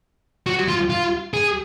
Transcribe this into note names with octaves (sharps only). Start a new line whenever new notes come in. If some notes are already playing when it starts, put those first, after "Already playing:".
F#4
F4
F4
G#4